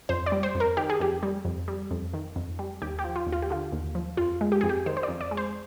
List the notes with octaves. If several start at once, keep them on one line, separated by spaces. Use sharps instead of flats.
F2 C5
D5
G3
C5
F2
A#4
D#3 G4
G#4
F2 G4
G3
F2
G3
F2
D#3
F2
G3
D#2 G4
G4
F3
F4
D#2
F4
G4
D3 F4
D#2
F3
F2 F4
G#3
G4
F2 G#4
G4
D#3 C5
C5
F2 D5
D5
G#3
C5